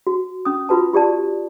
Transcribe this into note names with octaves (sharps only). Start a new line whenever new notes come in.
F#4
C#4 D#6
F4 F#4 B4 A5
F4 G4 D5 A5